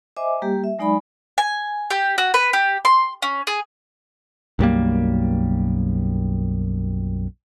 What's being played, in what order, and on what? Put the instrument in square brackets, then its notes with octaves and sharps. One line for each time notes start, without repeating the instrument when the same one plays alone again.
[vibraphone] C5 D#5 E5 G#5 D6
G3 A#3 G4
E5
F#3 G#3 D#4 D5 G#5 B5
[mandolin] G#5
G4
F#4
B4
G4
C6
C#4
G#4
[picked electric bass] B1 F#2 G3 A#3